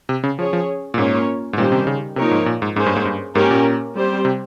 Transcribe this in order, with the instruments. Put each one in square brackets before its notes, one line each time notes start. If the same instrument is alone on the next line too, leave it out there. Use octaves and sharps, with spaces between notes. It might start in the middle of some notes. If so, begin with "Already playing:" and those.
[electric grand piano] C3
C#3
[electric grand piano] F3 [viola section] C#4 G#4 C#5
[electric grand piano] F3
A#2
[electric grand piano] G#2 [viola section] A#3 C#4 F4 A#4 C#5
[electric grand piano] G#2
[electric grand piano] A#2 [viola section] D#3 G3 C#4 G4 C5
[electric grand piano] C3
C#3
[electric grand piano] C3 [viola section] F3 A#3 D#4 A#4 C#5
[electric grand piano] G#2
A#2
G#2
[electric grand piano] G#2 [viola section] A#3 C#4 G#4 C5
[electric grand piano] G2
G#2
G2
[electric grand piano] G#2 [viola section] A#3 C#4 G4 A#4
[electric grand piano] A#2
[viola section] G3 C4 G4 C5
[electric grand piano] C3